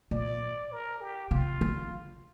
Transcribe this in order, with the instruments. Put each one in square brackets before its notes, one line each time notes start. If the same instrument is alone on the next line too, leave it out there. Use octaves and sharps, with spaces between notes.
[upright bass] A#2 [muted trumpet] D5
[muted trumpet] A#4
G4
[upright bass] C3 [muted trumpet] F4
[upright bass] D3